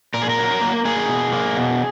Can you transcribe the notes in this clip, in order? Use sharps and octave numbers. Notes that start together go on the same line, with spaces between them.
A#2 A#4
G#4
A#4
F#3
A#3
A#3 G#4
B2
A#3
B2